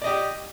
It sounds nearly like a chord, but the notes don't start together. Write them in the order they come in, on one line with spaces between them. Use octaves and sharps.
D5 D#5 G4